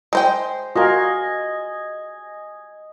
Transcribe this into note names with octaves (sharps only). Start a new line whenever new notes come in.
G#3 C5 G5
F4 F#4 A#4 D#5 G#5